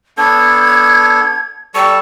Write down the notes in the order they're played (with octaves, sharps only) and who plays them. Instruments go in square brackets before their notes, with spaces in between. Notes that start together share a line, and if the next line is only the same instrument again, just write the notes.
[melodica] B3 D4 A4 [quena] G#6
[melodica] G3 A4 A5 [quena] C#6